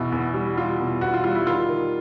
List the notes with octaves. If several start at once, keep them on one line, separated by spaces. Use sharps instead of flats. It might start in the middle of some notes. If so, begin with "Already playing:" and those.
Already playing: E2 B2 E4
E2
G3
G3 F4
B2
E2 F#4
F4
G3 F4
E4
D#3 F4
D#3